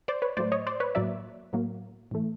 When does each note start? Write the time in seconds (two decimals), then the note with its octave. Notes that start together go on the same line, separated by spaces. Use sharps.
0.08 C5 D5
0.22 B4 C#5
0.37 A2 F#3 A3 C5 D5
0.52 C#5 D#5
0.67 C5 D5
0.80 B4 C#5
0.95 A2 F#3 A#3 D5 E5
1.53 A2 F#3 A#3
2.11 A2 E3 A3